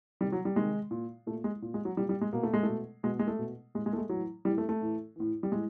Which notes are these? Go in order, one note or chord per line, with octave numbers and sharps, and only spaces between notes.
C3 D#3 G3
F#3
G3
C3 D#3 G#3
A#2
A#2 A3
G#3
A#2
G#3
F#3
A#2 G3
G3
G#3
B2 A#3
A3
G#3
B2 A3
B2 G#3
G#3
A3
B2
A2 E3 G#3
G#3
A3
G#3
A2 E3 F#3
A2 E3 G3
A3
A3
A2 E3
A2 E3
G3
A2 E3 G#3